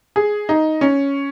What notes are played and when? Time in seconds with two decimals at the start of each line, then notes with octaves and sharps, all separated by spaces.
0.16 G#4
0.49 D#4
0.81 C#4